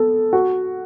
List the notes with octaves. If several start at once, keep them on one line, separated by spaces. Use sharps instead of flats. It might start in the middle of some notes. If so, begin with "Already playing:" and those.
Already playing: B3 A4
F#4